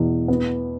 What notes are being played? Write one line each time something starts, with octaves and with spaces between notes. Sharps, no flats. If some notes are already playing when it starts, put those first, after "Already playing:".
Already playing: E2 B2
B3